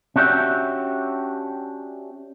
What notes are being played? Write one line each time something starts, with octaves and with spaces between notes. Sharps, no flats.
C#4 D4 F#4 G4 E5